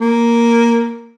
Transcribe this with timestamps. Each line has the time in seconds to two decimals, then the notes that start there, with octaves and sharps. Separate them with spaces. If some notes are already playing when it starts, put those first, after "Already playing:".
0.01 A#3